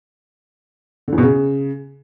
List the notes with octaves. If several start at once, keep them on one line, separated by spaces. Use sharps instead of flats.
D3
E2
B2
C#3